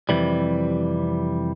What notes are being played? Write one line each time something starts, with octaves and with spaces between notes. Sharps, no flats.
F2 A2 C3 E3 G3